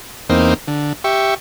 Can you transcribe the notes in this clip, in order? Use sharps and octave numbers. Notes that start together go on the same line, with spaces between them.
E2 A#3 C4 D#4
D3
G4 E5 C#6